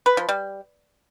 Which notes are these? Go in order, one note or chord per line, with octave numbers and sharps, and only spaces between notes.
B4
F3
G3